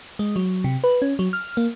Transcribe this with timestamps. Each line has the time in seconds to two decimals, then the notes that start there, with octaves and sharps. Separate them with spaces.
0.19 G#3
0.36 F#3
0.64 C3
0.84 B4
1.02 C#4
1.19 F#3
1.33 F6
1.57 A#3